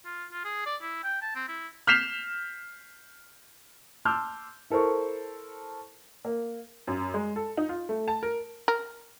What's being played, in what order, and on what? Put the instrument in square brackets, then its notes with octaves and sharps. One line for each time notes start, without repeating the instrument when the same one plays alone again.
[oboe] F4
F4
G#4
D5
E4
G5
A5
C4
E4
[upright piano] F6 G6 B6 C7 E7 F7
A5 C6 D6 E6 F6 G6
E4 A4 A#4 C5 C#6
A#3
[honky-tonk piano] F#2
G#3
A4
D#4
F4
A3
A5
A#4
[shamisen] A#4